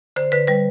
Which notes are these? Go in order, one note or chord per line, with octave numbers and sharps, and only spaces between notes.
D3 C5
D3 B4
G3 B4